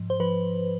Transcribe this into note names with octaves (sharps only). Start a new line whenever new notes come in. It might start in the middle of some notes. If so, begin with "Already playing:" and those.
Already playing: G#2 F3
C5
F3 B4